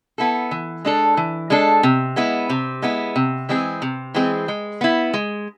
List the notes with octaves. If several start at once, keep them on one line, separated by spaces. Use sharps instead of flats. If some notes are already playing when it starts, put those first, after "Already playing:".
B3 E4 A4
E3
G#3 D4 A4
E3
G#3 D4 A4
C3
G#3 B3 E4
C3
G#3 B3 E4
C3
E3 G#3 C4 G#4
C3
E3 G#3 C4 G#4
G#3
B3 E4
G#3